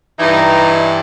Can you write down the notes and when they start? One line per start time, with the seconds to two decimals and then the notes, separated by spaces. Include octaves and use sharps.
0.19 G2 E3 D#4